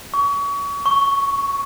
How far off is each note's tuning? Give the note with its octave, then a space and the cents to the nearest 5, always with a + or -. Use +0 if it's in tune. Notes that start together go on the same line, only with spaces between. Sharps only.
C#6 +35
C#6 +5